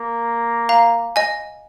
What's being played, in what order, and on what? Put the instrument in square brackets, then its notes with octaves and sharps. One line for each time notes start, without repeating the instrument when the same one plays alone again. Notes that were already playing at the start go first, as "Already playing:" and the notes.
Already playing: [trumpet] A#3
[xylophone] F5 A#5
D#5 G#5